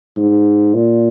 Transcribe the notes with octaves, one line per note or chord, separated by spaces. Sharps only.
G#2
A#2